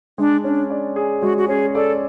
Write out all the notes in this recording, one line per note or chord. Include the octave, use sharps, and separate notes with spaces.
G#3 D4
C#4 D4
D5
G#4
G#3 F#4
F#4
C#4 G#4
A4 D5